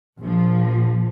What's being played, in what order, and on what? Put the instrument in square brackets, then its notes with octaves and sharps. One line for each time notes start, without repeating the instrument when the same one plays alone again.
[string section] A#1 F3